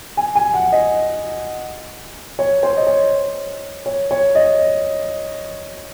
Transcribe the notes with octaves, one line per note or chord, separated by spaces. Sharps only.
G#5
G#5
F#5
D#5
C#5
C5
D#5
C#5
C#5
C#5
D#5